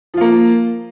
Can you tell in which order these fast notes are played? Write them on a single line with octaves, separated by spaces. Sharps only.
F3 F4 A#3